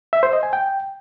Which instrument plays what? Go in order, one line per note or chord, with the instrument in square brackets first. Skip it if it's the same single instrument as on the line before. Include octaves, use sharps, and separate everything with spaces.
[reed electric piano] E5
C5
D#5
G#5
G5